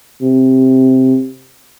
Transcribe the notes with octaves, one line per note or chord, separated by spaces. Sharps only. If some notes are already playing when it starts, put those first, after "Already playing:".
C3